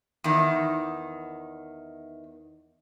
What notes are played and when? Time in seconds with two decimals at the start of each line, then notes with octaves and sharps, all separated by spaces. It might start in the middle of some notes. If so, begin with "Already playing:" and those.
0.24 E2 D#3